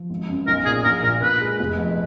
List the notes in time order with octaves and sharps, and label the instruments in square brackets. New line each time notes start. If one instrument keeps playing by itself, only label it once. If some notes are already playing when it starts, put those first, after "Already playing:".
Already playing: [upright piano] F3
G#1
F#2
[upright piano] B1 [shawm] A#4
[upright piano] A#2 [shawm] G#4
[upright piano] A#1 [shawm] A#4
[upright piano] A#2 [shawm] A#4
[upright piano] A#2 [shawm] B4
[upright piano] G#3
F1
F2